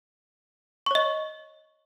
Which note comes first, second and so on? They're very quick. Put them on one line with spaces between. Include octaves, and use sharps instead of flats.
C#6 C#5 D#5